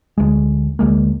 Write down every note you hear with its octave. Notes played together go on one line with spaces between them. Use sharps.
D2 G#3
D2 G#3 A#3